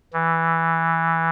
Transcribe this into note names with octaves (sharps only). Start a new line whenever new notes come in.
E3